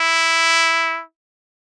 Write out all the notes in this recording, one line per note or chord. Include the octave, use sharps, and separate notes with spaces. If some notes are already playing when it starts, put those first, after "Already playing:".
Already playing: E4